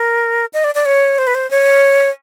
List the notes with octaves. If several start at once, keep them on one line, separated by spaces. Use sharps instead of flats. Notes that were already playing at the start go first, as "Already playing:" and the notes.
Already playing: A#4
D#5
D5
D5
C#5
C5
B4
C5
C#5